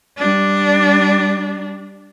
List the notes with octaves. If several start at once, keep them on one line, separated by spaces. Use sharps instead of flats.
G3 D4